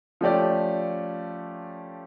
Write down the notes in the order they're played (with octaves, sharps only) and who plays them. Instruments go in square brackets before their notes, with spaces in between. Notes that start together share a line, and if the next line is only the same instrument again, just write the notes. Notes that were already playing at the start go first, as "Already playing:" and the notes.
[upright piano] F3 A3 C#4 G4 D5